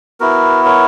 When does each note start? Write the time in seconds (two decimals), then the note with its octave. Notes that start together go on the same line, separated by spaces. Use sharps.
0.20 B3 E4 F#4 A#4
0.65 A#4 C#5